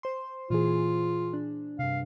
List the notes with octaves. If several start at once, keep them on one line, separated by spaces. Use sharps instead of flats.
C5 C6
A#2 E3 F4 G#4
D4
G2 C3 F5